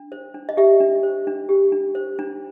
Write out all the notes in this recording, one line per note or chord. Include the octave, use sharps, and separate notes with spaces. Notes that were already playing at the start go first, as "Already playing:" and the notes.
Already playing: D4
C5
D4
D#5
G4 E5
D4
C5
D4
G4
D4
C5
D4